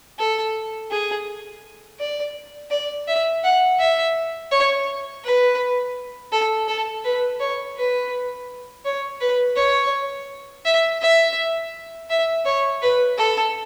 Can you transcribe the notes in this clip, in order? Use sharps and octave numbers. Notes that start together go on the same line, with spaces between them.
A4
G#4
D5
D5
E5
F#5
E5
C#5
B4
A4
A4
B4
C#5
B4
C#5
B4
C#5
E5
E5
E5
C#5
B4
A4